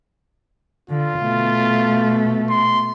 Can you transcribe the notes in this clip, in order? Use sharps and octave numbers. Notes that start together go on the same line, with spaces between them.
D3 F4
B2 A3
C6